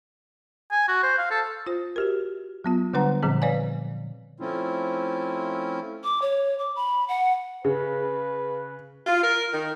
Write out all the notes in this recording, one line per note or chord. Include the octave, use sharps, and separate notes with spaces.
G#5
F#4
C5
F5
A4
F4 C5
F#4 G4 A#4
F#3 B3 F4
D3 G3 D4 B4 F#5 A#5
A#2 D3 F3 C4 G#4
B4 C#5 D5 F5 G#5
F3 A3 C4 C#4 E4 F4
D6
C#5
D6
B5
F#5
C#3 B4
F4
A#4
D#3